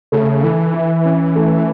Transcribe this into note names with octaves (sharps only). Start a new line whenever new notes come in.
C#3 A3
E3 A4
E4
C#4
A3